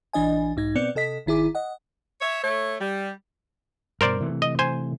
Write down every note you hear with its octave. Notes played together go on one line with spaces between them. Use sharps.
A#1 E3 D4 D#5 G#5
B1 G#2 D#4 G#6
B2 B3 C4 D5 C#7
C3 A4 D#5 B6
G#1 D#3 E4 G#4 D6
D#5 F#5
C#5 E5
A3 C#5
G3
G2 B2 A#4 C5 D5
C3 E3 A3
D#5
C5 G#5